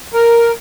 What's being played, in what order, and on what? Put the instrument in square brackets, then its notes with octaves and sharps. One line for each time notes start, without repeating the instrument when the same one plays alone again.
[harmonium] A#4